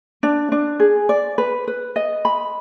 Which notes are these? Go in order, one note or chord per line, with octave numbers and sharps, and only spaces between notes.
D4
D4
G#4
D5
B4
B4
D#5
B5